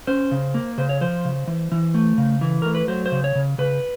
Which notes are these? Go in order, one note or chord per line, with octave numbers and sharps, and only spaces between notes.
C#4 C5
C#3
A#3
C#3 C5
C#5
F3 C5
C#3
E3
E3
A3
C#3
E3
A3 A#4
B4
F#3 C5
C5
C#3
C#5
C#3
C#3 B4